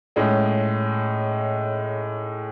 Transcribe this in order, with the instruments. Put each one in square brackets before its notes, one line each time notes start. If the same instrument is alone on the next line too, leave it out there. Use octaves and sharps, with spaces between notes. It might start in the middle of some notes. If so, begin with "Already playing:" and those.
[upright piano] A2 G#3 C#4